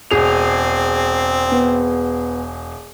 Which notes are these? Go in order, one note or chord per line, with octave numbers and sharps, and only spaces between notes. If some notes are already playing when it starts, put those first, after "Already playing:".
E1 C4 G#4 F7
B3